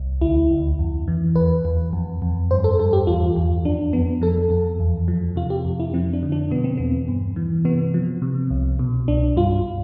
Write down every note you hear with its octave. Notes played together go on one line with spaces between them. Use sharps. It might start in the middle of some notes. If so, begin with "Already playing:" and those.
Already playing: C2
D2 E4
D2
F2
E3
E2 B4
E2
F2
F2
G2 C5
A4
G2 A4
G4
E2 F4
E2
F2 D4
F2 B3
F3 A4
F2
E2
F3
C3 F4
G4
F2
E4
F3 C4
D4
D3
D4
B2 B3
C4
E2 B3
G2
E3
C3 B3
F3
C3
C2
B2
C2 D4
G2 F4